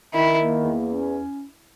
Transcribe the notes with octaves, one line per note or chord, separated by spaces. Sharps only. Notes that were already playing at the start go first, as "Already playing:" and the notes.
D#3 E4
A#3
E2
C#4